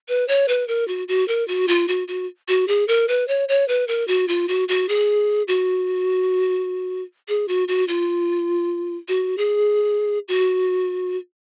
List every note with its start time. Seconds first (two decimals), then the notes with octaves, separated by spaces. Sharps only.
0.09 B4
0.28 C#5
0.48 B4
0.68 A#4
0.88 F#4
1.08 F#4
1.28 A#4
1.48 F#4
1.68 F4
1.88 F#4
2.08 F#4
2.48 F#4
2.68 G#4
2.88 A#4
3.08 B4
3.28 C#5
3.49 C#5
3.68 B4
3.88 A#4
4.08 F#4
4.28 F4
4.48 F#4
4.69 F#4
4.89 G#4
5.48 F#4
7.28 G#4
7.48 F#4
7.68 F#4
7.88 F4
9.08 F#4
9.38 G#4
10.28 F#4